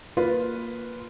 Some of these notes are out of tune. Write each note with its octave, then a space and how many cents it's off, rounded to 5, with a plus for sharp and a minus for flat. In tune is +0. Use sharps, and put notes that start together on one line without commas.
A#3 +0 F4 +0 B4 +0